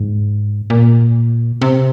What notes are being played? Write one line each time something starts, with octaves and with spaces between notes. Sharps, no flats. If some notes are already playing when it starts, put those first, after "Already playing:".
Already playing: G#2
A#2
C3